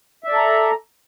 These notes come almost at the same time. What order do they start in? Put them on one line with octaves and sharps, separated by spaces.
E5 D5 A4 A#5